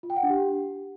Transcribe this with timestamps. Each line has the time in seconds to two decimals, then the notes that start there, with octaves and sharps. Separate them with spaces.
0.03 F4
0.10 G5
0.16 F#5
0.23 D4
0.30 G4